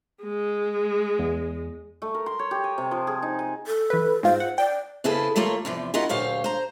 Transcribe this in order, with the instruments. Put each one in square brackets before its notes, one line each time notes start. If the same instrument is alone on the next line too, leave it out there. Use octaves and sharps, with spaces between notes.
[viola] G#3
[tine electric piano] E2
[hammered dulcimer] A3
A#4
C6
C#5
G4
G#5
C3
F3
G#4
D#4
G#5
[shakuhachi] A4
[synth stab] E3 B4
[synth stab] G#2 F4 [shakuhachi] C5
[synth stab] F#5
[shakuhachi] D5 [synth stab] G5
[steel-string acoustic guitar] F2 C#3 E4 G#4 A4 B4
D#2 A3 A#3 F4 C#5
E2 C3 F3
C#4 E4 F4 A#4 D#5 F#5
D2 A#2 F#3 G4 C#5 F5
C5 A#5